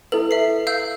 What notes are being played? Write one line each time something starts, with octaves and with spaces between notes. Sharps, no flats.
E4 A4 B4 F#7
E5 C7
F5 E6 G6